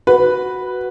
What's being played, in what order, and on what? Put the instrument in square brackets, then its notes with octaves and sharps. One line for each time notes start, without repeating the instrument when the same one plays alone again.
[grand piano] F#4 [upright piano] B4